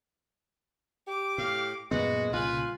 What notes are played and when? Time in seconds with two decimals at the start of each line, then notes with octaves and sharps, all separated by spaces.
1.08 G4 D6
1.38 A2 F5
1.91 F#2 A#2 G#3 B3 F#4 B4
2.33 C2 A#2 C#3 F4 B4 G#5